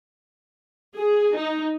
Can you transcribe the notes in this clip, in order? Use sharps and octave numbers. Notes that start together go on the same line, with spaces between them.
G#4
D#4